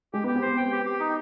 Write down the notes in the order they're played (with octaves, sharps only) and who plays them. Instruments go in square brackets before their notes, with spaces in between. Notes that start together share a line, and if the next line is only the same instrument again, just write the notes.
[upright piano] G#3 [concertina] G4
[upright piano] B3 [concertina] G4
[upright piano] C4
[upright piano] B3 [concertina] C5
[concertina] G5
G4
G4
D#4